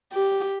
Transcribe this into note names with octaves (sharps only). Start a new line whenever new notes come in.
G4